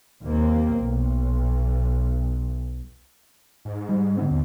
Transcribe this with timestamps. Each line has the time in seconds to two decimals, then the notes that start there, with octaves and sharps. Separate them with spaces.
0.23 D#2 A#3 C4
0.79 B1
3.65 G#2
3.89 G3
4.17 D3 B3 C4
4.31 D#2